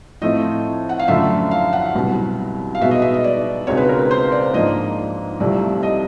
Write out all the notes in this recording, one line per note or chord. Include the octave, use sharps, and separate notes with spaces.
A2 F3 A3 C4 D#5
F#5
F5
F#2 D3 F3 A3 E5
F5
F#5
C2 B2 F#3
F5
B2 G#3 B3 E5
D#5
E5
D#5
D5
C#2 B2 G#3 C4 C#5
B4
A#4
B4
C5
D5
G#2 F3 A#3 D4 D#5
C2 C3 F3 A3 D5
D#5